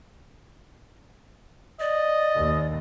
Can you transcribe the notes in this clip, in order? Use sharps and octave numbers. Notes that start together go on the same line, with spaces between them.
D5 D#5
D#2